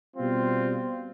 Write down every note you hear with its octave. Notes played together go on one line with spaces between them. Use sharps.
B2 G3 C4 F4